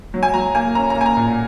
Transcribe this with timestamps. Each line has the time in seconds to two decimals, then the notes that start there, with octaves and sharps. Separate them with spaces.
0.14 F#3
0.23 G#5
0.34 F#3 A#5
0.54 A#3 G#5
0.75 C#4 A#5
0.90 A#5
0.96 A#3 G#5
1.06 A#5
1.17 A#2